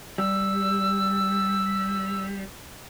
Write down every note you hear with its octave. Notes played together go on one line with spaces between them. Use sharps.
G3 E6